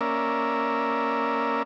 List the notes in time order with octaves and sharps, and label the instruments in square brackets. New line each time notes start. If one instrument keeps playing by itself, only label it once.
[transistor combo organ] A#3 C#4 A#4 D5 E5